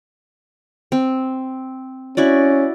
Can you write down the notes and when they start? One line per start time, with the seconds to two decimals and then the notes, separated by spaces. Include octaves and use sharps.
0.92 C4
2.17 C#4 E4 F#4 D5